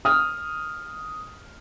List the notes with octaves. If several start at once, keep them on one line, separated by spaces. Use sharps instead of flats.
D#6 F6